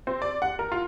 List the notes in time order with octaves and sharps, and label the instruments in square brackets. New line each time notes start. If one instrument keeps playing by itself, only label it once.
[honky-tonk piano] C4
D5
F#5
A#4
F4